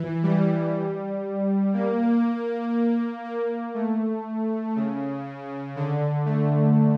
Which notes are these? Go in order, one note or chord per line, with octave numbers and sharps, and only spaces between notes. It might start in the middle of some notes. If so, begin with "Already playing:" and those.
Already playing: E3
G3
A#3
A#3
A#3
A3
C#3
D3
A3